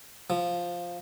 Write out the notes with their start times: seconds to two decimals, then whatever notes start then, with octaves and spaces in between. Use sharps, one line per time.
0.30 F3